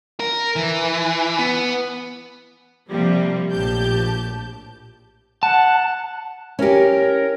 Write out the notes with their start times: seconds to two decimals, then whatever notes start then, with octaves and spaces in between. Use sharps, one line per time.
0.20 A#4
0.56 E3
1.39 B3
2.89 C3 F3 G3 A#3
3.52 A#1 A2 G4 A5 G6
5.43 F#5 A5
6.59 C#4 E4 G4 A#4